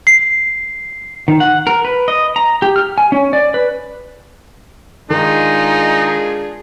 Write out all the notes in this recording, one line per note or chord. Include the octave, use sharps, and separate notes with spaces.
C7
D#3
F#5
A#4
B4
D#5
A#5
G4
F6
G#5
C#4
D5
B4
D#3 G#3 D4 D#4 F4 G#4